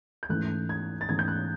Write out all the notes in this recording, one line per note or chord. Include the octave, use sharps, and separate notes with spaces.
G6
G#2 E3 A3 C#4 F#6
G#6
A6
G#2 E3 A3 C#4 G#6
G6
F#6